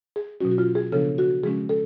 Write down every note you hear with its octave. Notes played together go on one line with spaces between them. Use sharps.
G#4
B2 F#3 C#4 F#4
F#4
F4
G#4
C#3 F3 B3 D4 A4
F#4
C#3 F3 G#3 C#4 G#4
A4